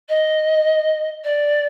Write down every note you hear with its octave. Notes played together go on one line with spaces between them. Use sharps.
D#5
D5